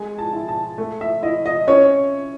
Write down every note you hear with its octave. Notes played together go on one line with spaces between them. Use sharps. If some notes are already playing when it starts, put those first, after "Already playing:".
Already playing: G#3 G#5
A5
E4
A5
A3
E5
E4 D#5
D#5
C#4 C#5